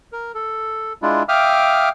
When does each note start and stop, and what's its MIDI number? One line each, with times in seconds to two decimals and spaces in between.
0.12 0.32 70
0.35 0.93 69
1.02 1.23 56
1.02 1.23 62
1.02 1.23 64
1.02 1.23 65
1.29 1.89 76
1.29 1.89 77
1.29 1.89 79
1.29 1.89 86
1.29 1.89 87
1.29 1.89 89